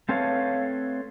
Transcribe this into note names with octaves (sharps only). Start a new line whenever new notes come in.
A3 C4 A4 B4 C#5 F5